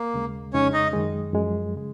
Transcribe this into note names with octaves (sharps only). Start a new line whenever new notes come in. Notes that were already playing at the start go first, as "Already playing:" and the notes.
Already playing: A#3
D#2 C#3 G#3
F2 C#3 G#3 C#4 D#4 C#5
D#4 D#5
F#2 D#3 G#3
F#2 F3 G#3
C#3 G#3